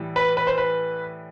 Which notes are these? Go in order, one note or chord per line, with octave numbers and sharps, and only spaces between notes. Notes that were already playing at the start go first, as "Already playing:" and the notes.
Already playing: A2 E3 G3
B4
B4
C5
B4